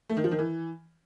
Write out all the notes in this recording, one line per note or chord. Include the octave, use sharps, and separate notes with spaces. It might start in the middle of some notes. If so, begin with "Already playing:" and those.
A3
D#3
F3
D#3
E3